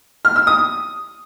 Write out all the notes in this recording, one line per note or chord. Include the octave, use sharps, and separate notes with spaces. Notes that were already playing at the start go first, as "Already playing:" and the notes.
F6
E6
D#6